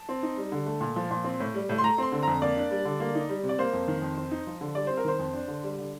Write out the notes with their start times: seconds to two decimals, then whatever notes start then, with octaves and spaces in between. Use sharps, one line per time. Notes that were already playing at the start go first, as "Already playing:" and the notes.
Already playing: A5
0.09 C4
0.23 D#4
0.37 G3
0.52 D3
0.67 A3
0.81 A#2
0.96 F3
1.11 A#2
1.24 C4
1.40 A2
1.54 G3
1.69 A2
1.78 C6
1.83 A3 A#5
1.98 C4 C6
2.12 D3
2.23 F2 A#5
2.42 A#3 D5
2.57 D4
2.71 G3
2.85 D3
3.00 A#3
3.15 D#4
3.29 G3
3.43 C3
3.49 D5
3.59 A#3 C5
3.73 F2
3.88 D#3
4.02 F2
4.17 C4
4.31 D#4
4.47 F3
4.61 D3
4.75 G3 D5
4.87 C4 C5
4.97 A#4
5.05 D#3 C5
5.19 F2
5.34 D4
5.48 D3
5.63 G3
5.78 D3